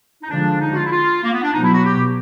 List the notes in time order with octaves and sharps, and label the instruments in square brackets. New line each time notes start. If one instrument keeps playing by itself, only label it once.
[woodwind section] D#4
[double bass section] D3 F3 G#3 [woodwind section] D4
[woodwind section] D#4
F#4
F4
E4
F4
A#3
B3
D4
[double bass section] B2 F#3 B3 [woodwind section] D#4
[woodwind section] E4
F#4
G4